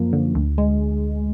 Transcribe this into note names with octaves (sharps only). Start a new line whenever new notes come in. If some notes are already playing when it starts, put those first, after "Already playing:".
Already playing: F#2 F3 A#3
D3
D2
G#3